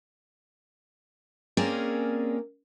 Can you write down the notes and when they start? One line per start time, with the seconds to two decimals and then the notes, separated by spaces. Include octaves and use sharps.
1.57 A#3 C4 C#4 G#4 A#4 D5